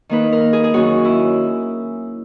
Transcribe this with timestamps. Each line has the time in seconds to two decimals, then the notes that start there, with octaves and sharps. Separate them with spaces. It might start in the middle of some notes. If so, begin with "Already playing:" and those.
0.09 D#3 A#3 D#4 B4
0.32 A#4
0.53 G#4
0.64 G#4
0.74 F#2 D#3 A#3 C#4 F#4
1.05 E4